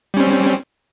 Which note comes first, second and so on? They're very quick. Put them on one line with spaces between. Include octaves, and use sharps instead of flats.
G3 C#4 C4